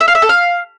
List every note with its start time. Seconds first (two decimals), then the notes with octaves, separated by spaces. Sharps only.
0.01 E5
0.08 F5
0.15 E5
0.22 A4
0.29 F5